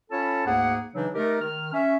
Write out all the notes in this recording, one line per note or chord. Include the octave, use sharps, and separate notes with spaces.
C#4 F4 A4 C#5 A5 B5
D2 G#2 A#3 G#4 F#5
C#3 E3 F#3 D4 D#4
A3 D#4 G4 A#4
D#3 F6
C#4 E5